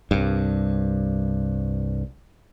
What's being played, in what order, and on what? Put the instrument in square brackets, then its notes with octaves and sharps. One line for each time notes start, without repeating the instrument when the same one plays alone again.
[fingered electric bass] C2 G2